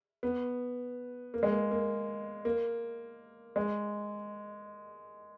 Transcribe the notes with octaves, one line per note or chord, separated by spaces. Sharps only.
B3
A#3
G#3
A#3
A#3
A#3
G#3